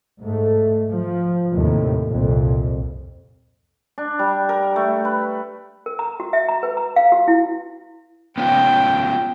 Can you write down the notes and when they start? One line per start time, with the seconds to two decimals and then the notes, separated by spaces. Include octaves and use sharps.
0.22 G#2 A3
0.91 F3
1.54 D#2 A2 C3
2.07 C2 F2 A#2
3.98 D4
4.19 G3
4.49 A#4
4.76 A3
5.05 B4
5.86 A#4
5.99 A#5
6.20 F#4
6.33 E5
6.49 A#5
6.63 B4
6.77 A#5
6.96 F5
7.12 F#4
7.28 E4
8.38 B3 C#4 F4 G5